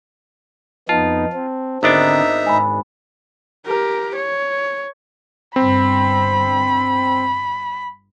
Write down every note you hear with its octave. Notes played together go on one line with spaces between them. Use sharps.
F2 B3 D#4 F4 A5
C4
G#1 D3 B3 C4 D4 D#4 E5 A#5
G#2 G#5 B5
G4 A#4
C#5
G1 G2 C4 B5